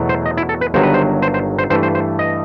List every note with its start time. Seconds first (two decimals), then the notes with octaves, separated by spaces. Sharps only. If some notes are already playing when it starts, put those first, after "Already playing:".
Already playing: E2 B2 F#3 A3
0.09 C5
0.26 D#5
0.37 E4
0.49 A4
0.61 B4
0.74 G1 G2 D#3 F#3 C5
0.83 B4
0.94 C5
1.22 C5
1.34 C5
1.58 C5
1.70 G2 E3 A3 C5
1.83 C5
1.95 C5
2.19 D#5